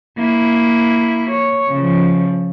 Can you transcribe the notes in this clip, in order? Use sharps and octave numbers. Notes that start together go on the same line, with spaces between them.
A#3 E4
C#5
C#3 F3